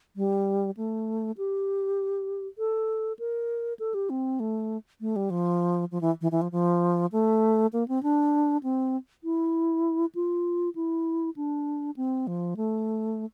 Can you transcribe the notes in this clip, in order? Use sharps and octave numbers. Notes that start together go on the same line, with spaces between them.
G3
A3
G4
A4
A#4
A4
G4
C4
A3
A3
G3
F3
F3
E3
E3
E3
F3
F3
A3
A#3
C4
D4
C4
E4
F4
E4
D4
C4
F3
A3